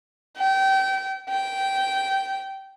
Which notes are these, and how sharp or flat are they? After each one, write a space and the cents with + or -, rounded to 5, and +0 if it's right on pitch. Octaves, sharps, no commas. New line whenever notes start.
G5 -25
G5 -15